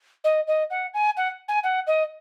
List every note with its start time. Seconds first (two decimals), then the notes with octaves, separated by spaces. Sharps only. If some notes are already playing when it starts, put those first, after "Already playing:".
0.24 D#5
0.47 D#5
0.70 F#5
0.94 G#5
1.17 F#5
1.48 G#5
1.63 F#5
1.87 D#5